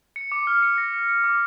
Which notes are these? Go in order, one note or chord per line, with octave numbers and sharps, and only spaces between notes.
C#7
D6
F6
C#7
A#6
C#7
C#7
D6